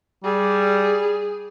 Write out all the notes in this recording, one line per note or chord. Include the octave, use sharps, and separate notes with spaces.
G3 G#4